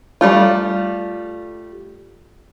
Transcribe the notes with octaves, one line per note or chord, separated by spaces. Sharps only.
G3 A3 F4